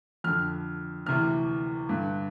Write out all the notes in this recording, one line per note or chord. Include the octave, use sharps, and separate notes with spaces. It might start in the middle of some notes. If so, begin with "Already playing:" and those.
F2 D3 F6
D2 C3 E3 F6
G2 D3